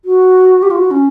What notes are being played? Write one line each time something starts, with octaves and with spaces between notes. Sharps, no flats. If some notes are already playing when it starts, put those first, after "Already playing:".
F#4
G4
F4
F#4
C#4